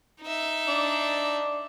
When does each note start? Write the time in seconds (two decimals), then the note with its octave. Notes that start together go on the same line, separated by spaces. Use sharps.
0.22 D#4 E5
0.68 D4